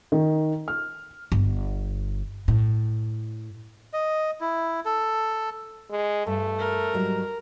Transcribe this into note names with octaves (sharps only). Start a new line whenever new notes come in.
D#3
F6
G1
A2
D#5
E4
A4
G#3
G2 A3
A#4
G#2 F#3 G3